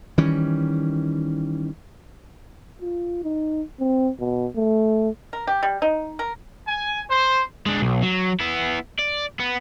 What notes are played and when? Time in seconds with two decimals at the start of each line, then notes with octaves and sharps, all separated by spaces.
0.18 D#3 E3 G3 C#4
2.82 F4
3.23 D#4
3.80 C4
4.19 B2
4.57 A3
5.33 A#4
5.47 G4
5.63 G3
5.82 D#4
6.19 A#4
6.67 G#5
7.09 C5
7.66 G#3 D4
7.82 B1
8.03 F#3
8.40 B3 E4
8.99 D5
9.39 B3